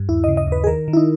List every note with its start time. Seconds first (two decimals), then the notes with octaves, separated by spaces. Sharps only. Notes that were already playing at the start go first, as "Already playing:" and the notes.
Already playing: G2
0.09 D#2 E4
0.24 C#3 D#5
0.37 D#5
0.47 D#2 B4
0.64 G#4
0.67 D#3 A#4
0.88 D#3
0.93 E4
0.97 D#4